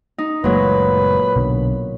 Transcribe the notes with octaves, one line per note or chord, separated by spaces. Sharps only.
D#4
F#1 A#2 F#3 G#3 A3 B4
B1 B2 D3